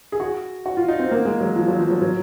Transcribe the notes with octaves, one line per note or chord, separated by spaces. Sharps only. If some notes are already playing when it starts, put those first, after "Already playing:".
G#4
F#4
F#4
F4
D#4
C4
A#3
G#3
F#3
F3
F#3
F3
F#3
F#3